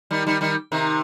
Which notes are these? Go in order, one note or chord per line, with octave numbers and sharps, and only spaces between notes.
D#3 G3
D#3 G3
D#3 G3
C3 D#3